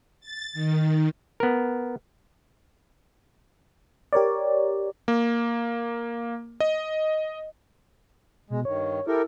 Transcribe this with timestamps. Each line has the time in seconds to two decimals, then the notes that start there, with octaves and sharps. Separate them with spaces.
0.20 A6
0.53 D#3
1.40 B3 A#4
4.13 G4 A#4 C#5 D5
5.08 A#3
6.60 D#5
8.50 B2 G#3
8.65 G2 D#3 C#5
9.07 E4 G4 A4 A#4